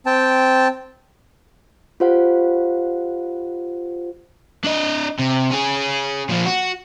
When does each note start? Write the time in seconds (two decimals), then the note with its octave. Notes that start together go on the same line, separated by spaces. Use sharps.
0.06 C4 G5 A5
2.00 F4 G4 C5 F5 F#5
4.64 D4 D#5
5.19 C3
5.51 C#4 G#4
6.30 A#2 F3
6.46 F#4